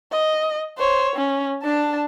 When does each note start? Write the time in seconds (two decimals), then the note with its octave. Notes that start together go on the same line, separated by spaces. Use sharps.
0.12 D#5
0.78 C5 C#5
1.16 C#4
1.62 D4 A5